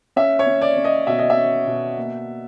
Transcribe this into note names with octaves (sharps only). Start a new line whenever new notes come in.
C#4 E5
C#5
C#4
D5
C#4
D#5
B2 E5
D#5
E5
C#4
B2
A#3